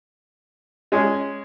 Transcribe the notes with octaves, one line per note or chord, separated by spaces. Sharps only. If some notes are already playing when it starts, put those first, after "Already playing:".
G#3 C#4 G#4